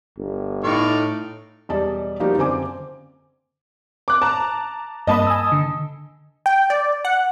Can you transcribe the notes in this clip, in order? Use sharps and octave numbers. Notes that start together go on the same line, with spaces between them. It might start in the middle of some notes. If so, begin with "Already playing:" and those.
G1
A2 D#4 D5 F5 C#6
E1 G3 D5 D#5 A5
F3 G3 A#3 D#4 F#4 G4
F#1 D3 C4 G#5 D6
D6 F#6
A5 A#5
G2 A#3 D#5 A5 B5 D#6
G#5 E6
D3
G5
D5
F#5